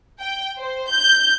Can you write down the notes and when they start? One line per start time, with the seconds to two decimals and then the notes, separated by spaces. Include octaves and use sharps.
0.21 G5
0.58 C5
0.90 G6